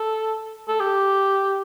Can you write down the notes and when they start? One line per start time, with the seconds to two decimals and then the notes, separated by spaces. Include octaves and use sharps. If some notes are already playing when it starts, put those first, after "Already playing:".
Already playing: A4
0.68 A4
0.80 G4